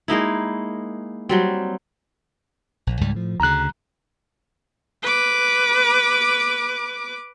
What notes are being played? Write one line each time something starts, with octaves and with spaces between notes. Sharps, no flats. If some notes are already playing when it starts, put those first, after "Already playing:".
G#3 A#3 D#4 E4
F#3 G3 C4
A#1
C#2 G#2 G3
A2 F3
D2 C#3 A#5 F#6
B4 D6